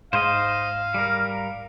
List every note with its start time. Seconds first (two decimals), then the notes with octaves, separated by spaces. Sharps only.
0.13 G#2 C5 D#5 F5
0.94 G3 A#4